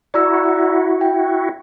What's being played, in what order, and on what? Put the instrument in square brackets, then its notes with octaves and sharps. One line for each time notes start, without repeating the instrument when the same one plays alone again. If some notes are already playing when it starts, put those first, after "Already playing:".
[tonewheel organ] E4 F#4 [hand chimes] D5 A#5 E6
[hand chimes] G5